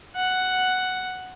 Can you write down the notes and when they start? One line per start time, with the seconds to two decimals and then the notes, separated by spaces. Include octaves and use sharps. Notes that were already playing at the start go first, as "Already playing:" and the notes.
0.16 F#5